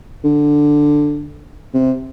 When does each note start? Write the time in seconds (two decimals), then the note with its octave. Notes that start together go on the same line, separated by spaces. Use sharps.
0.24 D3
1.74 C3